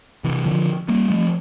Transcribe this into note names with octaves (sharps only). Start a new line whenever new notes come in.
C3 E3
D3 F3
G3 A#3
F3 A3